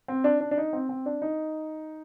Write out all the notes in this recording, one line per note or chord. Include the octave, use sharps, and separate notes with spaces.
C4
D4
D4
D4
D#4
C4
C4
D4
D#4